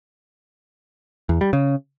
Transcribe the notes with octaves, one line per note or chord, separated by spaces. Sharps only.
E2
G3
C#3